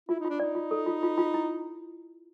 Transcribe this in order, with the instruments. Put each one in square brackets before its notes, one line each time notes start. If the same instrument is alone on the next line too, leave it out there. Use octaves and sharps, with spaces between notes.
[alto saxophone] E4 [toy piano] F4
[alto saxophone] D#4
[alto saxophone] D4 [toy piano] F4
[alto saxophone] D#4 [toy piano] D5
[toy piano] F4
A4
F4
F4
F4
E4